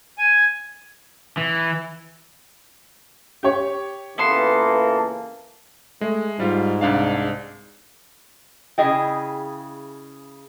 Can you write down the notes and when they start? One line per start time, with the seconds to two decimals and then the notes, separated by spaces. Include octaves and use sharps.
0.18 G#5
1.37 E3
3.43 G4 C#5
4.18 C#2 E3 A#3 B3 A4 C6
6.01 G#3 A3
6.40 G#2 G3 F4
6.81 C2 D4 F5
8.78 C#3 E4 G#4 D#5 G5